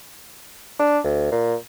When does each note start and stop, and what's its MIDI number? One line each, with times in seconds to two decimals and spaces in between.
0.79 0.99 62
1.04 1.31 38
1.32 1.55 46